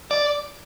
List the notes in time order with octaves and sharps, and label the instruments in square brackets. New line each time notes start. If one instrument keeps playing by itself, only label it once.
[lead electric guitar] D5